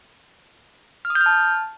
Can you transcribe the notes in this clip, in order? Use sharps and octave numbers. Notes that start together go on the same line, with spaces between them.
F6
D#6
G6
F6
A5